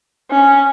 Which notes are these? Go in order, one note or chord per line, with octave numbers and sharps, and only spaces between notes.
C#4